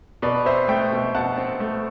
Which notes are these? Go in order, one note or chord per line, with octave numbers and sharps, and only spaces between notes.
B2 B4 D5
C4 C5 E5
A3 E5 G5
B2
B2 F#5 A5
C4
A3